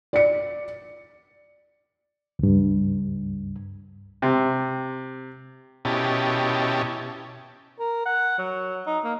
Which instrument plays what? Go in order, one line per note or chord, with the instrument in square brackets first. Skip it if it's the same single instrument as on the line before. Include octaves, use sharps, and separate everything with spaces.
[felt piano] D5 C#7
[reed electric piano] C#2 G2
[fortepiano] C3
[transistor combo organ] B2 C#4 E4 G4 D#5 A5
[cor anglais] A#4
F#5
F#3
D#4
A#3